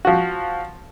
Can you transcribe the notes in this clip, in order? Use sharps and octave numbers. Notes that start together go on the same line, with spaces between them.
F3 F#4